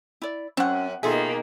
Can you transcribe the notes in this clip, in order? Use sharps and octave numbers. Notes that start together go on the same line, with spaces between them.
E4 D5
F#2 C4 C#4 F#5
B2 D#3 A#3 F4 G#4 A4 E5